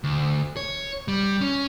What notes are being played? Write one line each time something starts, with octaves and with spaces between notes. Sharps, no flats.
D2
C#5
G3
C#4